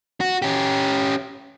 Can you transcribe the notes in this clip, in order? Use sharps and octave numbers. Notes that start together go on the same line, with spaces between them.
F#4
C#4 G4